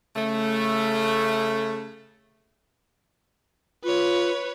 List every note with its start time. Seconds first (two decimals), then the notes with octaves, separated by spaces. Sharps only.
0.16 C#3 A3
3.84 F4 B4 C#5